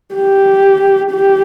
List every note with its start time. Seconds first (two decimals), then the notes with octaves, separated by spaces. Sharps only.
0.15 G4
1.12 G4